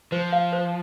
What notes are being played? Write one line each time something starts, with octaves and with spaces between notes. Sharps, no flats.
F3 C5
F5
C5